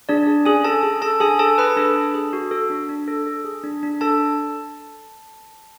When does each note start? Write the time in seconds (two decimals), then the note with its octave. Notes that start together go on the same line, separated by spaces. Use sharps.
0.09 D4 G#4 D5
0.27 G#4
0.45 C#4 G#4 G#5
0.64 G#4 A4 A5
0.83 G#4
1.01 G#4 A4 A5
1.20 D4 G#4 G#5
1.39 G#4 A4 A5
1.58 G#4 B4 B5
1.77 D4 A4 A5
1.95 D4
2.14 G#4
2.33 F#4
2.51 A4
2.70 D4
2.89 D4
3.08 A4
3.27 A4
3.45 G#4
3.64 D4
3.83 D4
4.01 D4 A4 A5